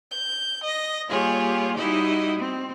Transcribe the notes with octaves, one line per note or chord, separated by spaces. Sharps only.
G6
D#5 A#6
G3 A#3 F4 G4 G#4 C#5
G3 D#4 E4 F#4 G4 D#5
C4